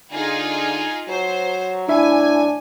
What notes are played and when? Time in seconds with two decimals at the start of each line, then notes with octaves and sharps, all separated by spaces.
0.12 D3 D#4 F4 G#4
1.09 F#3 C5
1.89 A2 D4 E4 E5 G#5